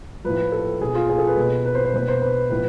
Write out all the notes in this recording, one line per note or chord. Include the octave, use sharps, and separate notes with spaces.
A2 F3 B4
A4
B2 G#4
F4
G#4
A4
B4
B2
B4
C5
C5
B2 B4
C5
B4
A2 F3 B4